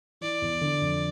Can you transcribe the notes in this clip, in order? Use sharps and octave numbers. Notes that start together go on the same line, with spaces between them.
E3 D5
E2
D3
F2